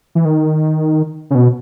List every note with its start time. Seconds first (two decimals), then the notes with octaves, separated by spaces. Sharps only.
0.15 E3
0.25 D#3
1.30 C#3
1.35 B2